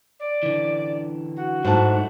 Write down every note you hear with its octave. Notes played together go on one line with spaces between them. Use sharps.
D5
D3 E3
F#4
G#2 F#3 A3 E4 A5